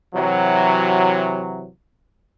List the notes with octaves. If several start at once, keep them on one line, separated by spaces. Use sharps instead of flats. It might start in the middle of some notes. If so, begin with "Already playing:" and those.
C3 E3 F#3